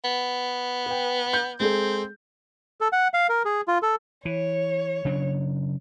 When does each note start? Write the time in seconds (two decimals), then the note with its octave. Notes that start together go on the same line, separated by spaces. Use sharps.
0.05 B3
0.86 B4 G5
1.33 G6
1.60 G#3 C4 G#4 A4
2.81 A4
2.93 F#5
3.14 F5
3.29 A#4
3.45 G#4
3.68 F4
3.83 A4
4.25 E3 C#5
5.05 C#3 F#3 D4